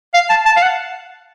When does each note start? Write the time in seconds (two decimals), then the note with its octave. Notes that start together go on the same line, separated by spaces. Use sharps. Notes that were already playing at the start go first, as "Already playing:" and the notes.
0.14 F5
0.30 A5
0.46 A5
0.57 F5
0.63 F#5